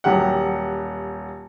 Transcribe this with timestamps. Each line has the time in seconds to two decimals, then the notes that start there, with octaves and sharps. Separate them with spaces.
0.04 D#1 F#3 G4 F#5